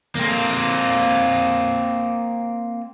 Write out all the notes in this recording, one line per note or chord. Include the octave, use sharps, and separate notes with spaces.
A#3 C4